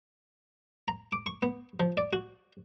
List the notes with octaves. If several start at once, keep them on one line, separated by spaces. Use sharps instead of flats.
A#5
D6
C#6
B3
F3
D5
F#4